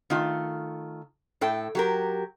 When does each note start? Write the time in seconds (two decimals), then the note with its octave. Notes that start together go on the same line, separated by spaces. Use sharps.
0.10 D#3 A3 F4
1.41 A2 A4 G5
1.75 F#3 G4 A#4